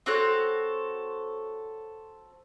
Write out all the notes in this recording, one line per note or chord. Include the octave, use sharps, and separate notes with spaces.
C4 F#4 A4 C#5